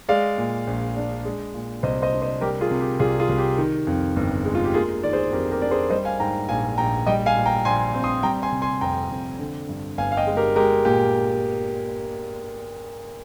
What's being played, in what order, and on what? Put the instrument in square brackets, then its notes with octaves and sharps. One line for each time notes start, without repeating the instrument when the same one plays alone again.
[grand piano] G#3 D5 F5
A#2
A#1
D4
G#3
A#2
C2 C5 D#5
C5 D#5
D4
C5 D#5
G3 G4 A#4
F4 G#4
C3
G4
C2 F4 G#4
F4 G#4
C2
G4
D#3
F2
G1
G#3
F4
G4
A#3 F4 G#4
D#3 D5
G#4 C5
F2 G4 A#4
G4 A#4
D4 D5
G#4 C5
G3 C5 D#5
F5 G#5
G#2 G5 A#5
A#1 F5 G#5
A#1 G5 A#5
G3 D#5 G5
F5 G#5
A#2
G5 A#5
A#1 G#5 C6
C4
C6 D#6
G3 G5 A#5
G#5 C6
C3
G#5 C6
F2 G5 A#5
F2
D3
G2
G1 F5 G#5
F5
D#5 G5
G#3
G4 A#4
G#3 G4 A#4
A#2 G4